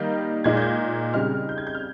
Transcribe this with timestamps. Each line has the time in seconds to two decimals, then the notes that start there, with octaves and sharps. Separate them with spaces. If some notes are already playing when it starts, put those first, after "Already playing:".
Already playing: D#3 G3 A#3 D#4 G6
0.44 A#2 G#3 D#4 G#6
0.57 G6
0.62 G#6
1.14 C#3 G3 C4 D#4 F6
1.49 G6
1.58 G#6
1.67 G6
1.75 F6